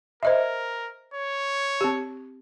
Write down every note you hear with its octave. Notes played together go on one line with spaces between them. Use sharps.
A#4 C5 D#5 E5
C#5
C4 G4